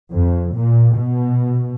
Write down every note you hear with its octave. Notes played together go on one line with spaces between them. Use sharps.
F2
A#2
B2